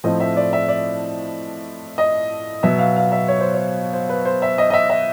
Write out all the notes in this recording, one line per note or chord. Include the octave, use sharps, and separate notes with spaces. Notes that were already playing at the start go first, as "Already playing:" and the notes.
A2 F3 A3 C4 D#5
E5
D5
E5
D5
D#5
B2 F#3 B3 E5
F5
F5
E5
C#5
C5
C#5
C5
B4
C5
E5
D#5
D#5
E5
E5